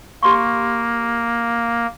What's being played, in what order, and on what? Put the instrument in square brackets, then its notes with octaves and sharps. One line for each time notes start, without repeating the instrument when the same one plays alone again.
[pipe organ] A#3 [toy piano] G4 C6 C#6